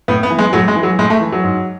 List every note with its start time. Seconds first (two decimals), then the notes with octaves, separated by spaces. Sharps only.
0.08 A2 B3
0.23 B3
0.30 E3
0.39 G#3
0.53 A2 F#3
0.68 G#3
0.76 E3
0.83 F#3
0.98 A2 G#3
1.10 A3
1.21 E3
1.32 F#3
1.44 G#2